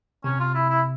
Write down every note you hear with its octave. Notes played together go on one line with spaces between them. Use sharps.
C3 C#4
F4
E4
E4